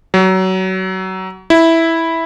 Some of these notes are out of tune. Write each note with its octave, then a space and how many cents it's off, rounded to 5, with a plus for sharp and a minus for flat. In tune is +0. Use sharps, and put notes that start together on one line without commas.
F#3 +25
E4 -5